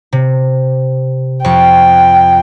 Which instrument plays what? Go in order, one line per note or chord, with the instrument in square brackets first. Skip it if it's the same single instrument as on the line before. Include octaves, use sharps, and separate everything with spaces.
[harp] C3
[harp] F2 C#6 [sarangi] G5